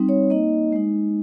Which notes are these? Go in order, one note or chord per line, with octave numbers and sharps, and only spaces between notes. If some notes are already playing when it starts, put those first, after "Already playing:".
Already playing: G3 C4 D#4
C#5
A#3 D#4 D#5
G#3 D#4